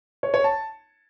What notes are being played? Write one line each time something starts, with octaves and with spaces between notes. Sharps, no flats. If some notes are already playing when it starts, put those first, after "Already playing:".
C#5
C#5
A5